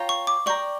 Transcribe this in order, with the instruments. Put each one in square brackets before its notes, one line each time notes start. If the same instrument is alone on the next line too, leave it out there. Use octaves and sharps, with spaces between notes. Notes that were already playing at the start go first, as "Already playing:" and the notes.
Already playing: [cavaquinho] F4 C#5 G5 A#5
[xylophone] C#6
D6
[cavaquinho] D5 G5 A#5 [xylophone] C#6